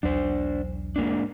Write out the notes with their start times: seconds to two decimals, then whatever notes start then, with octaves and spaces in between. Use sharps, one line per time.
0.03 B1 E2 F#3 D4 C5
0.96 G#2 A#3 D4